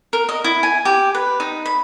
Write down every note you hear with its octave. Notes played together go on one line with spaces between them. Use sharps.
A#4
D#5
E4
G#5
G4
B4
D#4
B5